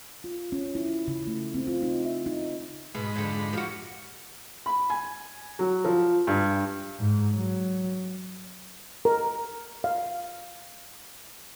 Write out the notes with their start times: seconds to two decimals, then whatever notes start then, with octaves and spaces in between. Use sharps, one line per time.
0.24 F4
0.52 C#4
0.75 E4
1.08 C#3
1.27 A3
1.54 C4
1.67 F4
1.83 D#4
2.05 E5
2.26 D#4
2.95 G#2 B2 G#3 B5
3.16 F2 D3
3.53 F3 F#4
4.66 B5
4.90 G#5
5.59 F#3
5.85 F3
6.27 G2
6.99 G#2
7.34 F#3
9.05 A#4
9.84 F5